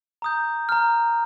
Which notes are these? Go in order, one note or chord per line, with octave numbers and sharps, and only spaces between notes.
A#5 D#6 G6
A#5 F6